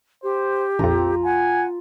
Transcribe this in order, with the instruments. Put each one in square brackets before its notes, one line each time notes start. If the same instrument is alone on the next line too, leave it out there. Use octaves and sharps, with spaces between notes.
[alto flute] G4 [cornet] C5
[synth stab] A#1 F2 [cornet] C4 [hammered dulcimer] F4 A#5
[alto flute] F#5 [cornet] G#5